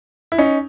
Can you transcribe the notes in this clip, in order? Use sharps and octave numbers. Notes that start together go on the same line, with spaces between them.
E4
C#4 D#4